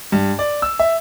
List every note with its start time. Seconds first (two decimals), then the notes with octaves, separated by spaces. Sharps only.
0.12 G2
0.39 D5
0.62 E6
0.79 E5